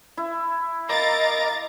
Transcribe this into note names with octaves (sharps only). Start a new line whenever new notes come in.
E4
A#4 D#5 F5 A#5 D6 A6